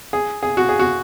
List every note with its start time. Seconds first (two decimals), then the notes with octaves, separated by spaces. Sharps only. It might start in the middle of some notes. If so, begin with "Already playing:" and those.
0.13 G#4
0.43 G#4
0.57 F#4
0.69 G#4
0.79 F#4